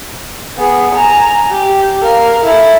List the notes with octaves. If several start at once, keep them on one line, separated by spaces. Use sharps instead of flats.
B3 G#4
G#5 A#5
G4
A#4 F5
E4 A4